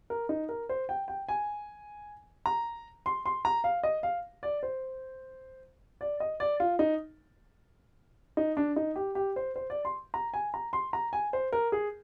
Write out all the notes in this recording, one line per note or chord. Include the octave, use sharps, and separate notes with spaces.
A#4
D#4
A#4
C5
G5
G5
G#5
A#5
C6
C6
A#5
F5
D#5
F5
D5
C5
D5
D#5
D5
F4
D#4
D#4
D4
D#4
G4
G4
C5
C5
D5
C6
A#5
G#5
A#5
C6
A#5
G#5
C5
A#4
G#4